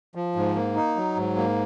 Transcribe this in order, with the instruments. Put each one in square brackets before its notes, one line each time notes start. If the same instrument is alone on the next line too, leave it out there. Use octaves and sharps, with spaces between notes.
[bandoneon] F3
G#2
A#3
D#4
F#3
G#2
A#3